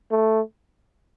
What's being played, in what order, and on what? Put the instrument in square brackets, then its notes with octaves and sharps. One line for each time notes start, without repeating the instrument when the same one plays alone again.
[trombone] A3